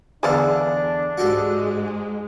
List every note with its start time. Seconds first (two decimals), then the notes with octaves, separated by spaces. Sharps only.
0.23 E2 D3 D4 G#4 A4 D5 F5
1.17 G#2 G#3 F#4 G4 A4